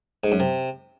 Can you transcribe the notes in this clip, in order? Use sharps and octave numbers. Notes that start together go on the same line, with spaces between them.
G#2
F#2
C3